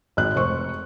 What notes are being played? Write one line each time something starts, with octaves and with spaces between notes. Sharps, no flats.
G#1 G#3 F#6
F1 C5 C#6